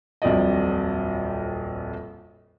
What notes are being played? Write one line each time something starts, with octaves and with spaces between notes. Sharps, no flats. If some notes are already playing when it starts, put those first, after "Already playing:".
D#1 A#1 F2 F#3 D5 D#5